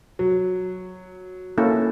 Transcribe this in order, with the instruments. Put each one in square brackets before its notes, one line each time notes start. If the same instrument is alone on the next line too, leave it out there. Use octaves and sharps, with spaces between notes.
[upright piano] F#3
[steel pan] A#3 C#4 E4 A4